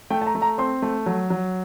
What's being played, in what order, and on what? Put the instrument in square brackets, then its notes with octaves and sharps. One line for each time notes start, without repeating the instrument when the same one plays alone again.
[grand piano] A3 G5
A5
A#5
A3
A#5
C4 C6
A3
F#3
F#3